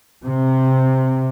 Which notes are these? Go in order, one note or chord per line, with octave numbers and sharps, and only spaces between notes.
C3